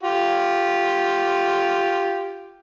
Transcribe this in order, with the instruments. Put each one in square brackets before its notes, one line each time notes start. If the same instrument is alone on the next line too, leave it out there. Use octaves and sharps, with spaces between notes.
[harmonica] F4 G4